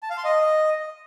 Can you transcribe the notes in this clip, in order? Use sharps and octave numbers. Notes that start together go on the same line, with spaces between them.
A5
F5
C6
D#5